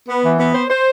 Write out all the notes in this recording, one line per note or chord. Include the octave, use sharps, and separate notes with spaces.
B3
E3
B3
C5
C5